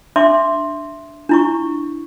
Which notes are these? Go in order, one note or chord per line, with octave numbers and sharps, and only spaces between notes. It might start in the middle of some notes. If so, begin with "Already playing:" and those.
D4 E5 C6 D6
D4 E4 C#6